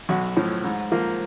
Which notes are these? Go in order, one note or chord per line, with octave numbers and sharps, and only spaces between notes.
B1 F#4
A2 F3
G#2
F3 A#3